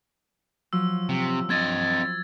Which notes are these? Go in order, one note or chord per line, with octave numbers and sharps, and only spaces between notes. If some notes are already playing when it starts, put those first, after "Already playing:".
F3 F#3 E6
C3
C4 D#5 G#6 A6